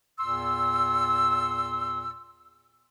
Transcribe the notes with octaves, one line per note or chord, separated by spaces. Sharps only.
E2 A#2 C6 E6